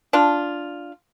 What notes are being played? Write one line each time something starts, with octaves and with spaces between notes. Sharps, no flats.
D4 F4